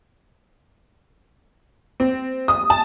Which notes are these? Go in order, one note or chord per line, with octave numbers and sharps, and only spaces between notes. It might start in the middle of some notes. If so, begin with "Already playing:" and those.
C4
D#6
A5